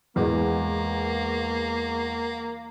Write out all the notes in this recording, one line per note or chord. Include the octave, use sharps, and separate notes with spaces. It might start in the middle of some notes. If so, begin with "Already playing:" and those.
E2 G#3 A#3